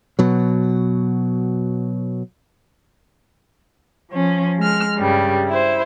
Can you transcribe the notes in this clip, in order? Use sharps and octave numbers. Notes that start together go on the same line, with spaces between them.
B2 F#3
F3 C#4
G#3 F6
G2 C#3 G3
E4 C5